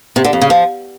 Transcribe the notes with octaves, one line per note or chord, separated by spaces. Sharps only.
C3
D3
F2
C#3
F3